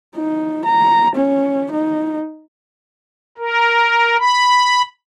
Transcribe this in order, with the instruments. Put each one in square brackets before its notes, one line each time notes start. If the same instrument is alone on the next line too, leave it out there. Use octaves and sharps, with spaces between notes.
[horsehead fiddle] D#4
A#5
C#4
D#4
[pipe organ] A#4
B5